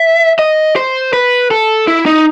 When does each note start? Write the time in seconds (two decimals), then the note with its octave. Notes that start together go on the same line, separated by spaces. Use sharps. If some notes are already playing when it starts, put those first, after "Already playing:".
Already playing: E5
0.39 D#5
0.76 C5
1.13 B4
1.51 A4
1.88 E4
2.06 D#4